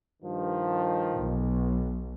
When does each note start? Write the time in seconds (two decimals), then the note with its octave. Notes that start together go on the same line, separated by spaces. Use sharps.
0.23 G2 D#3 F3
1.15 B1